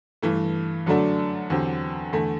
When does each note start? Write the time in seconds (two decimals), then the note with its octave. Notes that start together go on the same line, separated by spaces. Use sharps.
0.22 G2 E3 A3
0.86 F#2 D3 F#3 A3 D4
1.50 E2 D3 F#3 C4 G4
2.12 E2 D3 A3